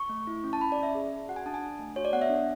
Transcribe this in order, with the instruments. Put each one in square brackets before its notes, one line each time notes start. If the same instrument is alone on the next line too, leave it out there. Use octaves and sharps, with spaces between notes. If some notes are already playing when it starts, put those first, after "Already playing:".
Already playing: [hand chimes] C#6
A3
E4
C#4
A5
C#4 B5
D5
C#4 E5
G#4
G#4
F#4 F#5
G#5
D4 A5
G#5
D4
A3
F#4 C#5
D5
B3 F#5
E5
D4